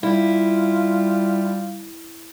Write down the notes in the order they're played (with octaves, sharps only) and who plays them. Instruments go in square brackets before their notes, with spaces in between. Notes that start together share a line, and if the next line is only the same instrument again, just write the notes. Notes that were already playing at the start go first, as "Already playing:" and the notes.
[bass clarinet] G3 [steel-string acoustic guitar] E4 [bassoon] F4